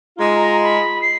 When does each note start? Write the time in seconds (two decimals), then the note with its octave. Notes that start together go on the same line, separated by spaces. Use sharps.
0.18 G#3 D#4 F4
0.35 A#5
0.63 B5
1.02 C7